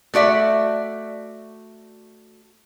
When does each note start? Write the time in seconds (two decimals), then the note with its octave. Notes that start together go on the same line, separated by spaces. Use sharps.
0.14 A3 F#4 D5 E5